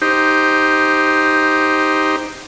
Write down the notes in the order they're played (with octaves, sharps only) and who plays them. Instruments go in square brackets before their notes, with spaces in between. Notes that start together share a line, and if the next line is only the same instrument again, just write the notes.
[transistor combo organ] D#4 G4 C5